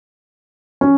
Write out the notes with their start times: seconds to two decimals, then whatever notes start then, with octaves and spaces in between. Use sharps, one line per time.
0.81 C#4